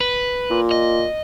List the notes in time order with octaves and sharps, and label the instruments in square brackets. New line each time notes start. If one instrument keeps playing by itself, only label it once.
[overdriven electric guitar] B4
[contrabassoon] A#2
[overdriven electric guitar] D#5